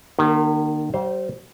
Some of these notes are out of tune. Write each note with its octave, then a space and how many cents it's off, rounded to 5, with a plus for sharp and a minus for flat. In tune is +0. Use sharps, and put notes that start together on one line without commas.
D#3 -40 A#3 +0 G4 -20
G3 -40 C5 +0 F5 +0